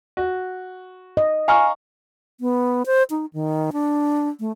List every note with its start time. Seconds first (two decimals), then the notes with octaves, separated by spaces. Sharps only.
0.17 F#4
1.17 D#5
1.48 F5 G#5 A#5 C#6 F6
2.40 B3
2.86 C5
3.10 D#4
3.33 D#3
3.72 D4
4.40 A3